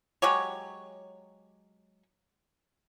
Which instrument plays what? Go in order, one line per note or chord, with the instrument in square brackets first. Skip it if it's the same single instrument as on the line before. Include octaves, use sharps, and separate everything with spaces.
[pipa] F#3 G#3 G4 C#5